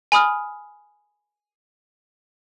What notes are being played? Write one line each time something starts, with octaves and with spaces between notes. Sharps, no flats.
G#5 B5 D#6 F6